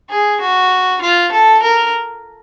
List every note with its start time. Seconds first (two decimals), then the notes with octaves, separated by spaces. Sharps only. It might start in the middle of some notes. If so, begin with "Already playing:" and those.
0.10 G#4
0.40 F#4
1.01 F4
1.32 A4
1.62 A#4